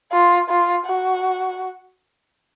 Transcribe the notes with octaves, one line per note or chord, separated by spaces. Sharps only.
F4
F4
F#4